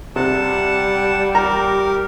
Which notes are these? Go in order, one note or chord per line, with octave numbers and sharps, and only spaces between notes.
C3 G3 F#5 A5
G4 A#4 A#5